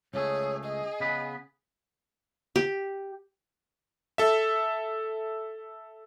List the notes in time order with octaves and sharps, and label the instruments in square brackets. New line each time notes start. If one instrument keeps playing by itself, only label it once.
[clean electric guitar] C#2 A3 [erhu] G#4 [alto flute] C#5
[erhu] G#4 [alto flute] D#5
[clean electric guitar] C#3 B3 B4
[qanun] G4
[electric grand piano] A4 E5